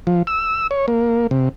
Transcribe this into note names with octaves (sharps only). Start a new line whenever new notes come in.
F3
E6
C#5
A#3
C3